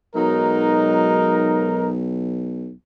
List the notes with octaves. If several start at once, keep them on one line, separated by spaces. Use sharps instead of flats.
B1 F#3 G#3 D#4 A#4